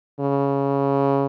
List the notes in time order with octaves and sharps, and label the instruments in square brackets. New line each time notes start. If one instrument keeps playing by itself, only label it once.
[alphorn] C#3